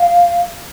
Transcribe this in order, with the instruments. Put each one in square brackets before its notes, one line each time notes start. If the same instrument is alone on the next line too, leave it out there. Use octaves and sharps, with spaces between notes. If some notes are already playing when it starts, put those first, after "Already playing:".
Already playing: [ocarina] F5